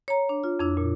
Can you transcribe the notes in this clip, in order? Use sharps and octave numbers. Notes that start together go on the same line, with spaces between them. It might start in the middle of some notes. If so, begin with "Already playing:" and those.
C#5 A#5
D4
F4
F2 D4 E4
A#2